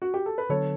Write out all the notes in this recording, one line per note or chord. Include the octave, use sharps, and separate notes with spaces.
F#4
G4
A4
B4
D3 F#3 B3 D4 A4 C#5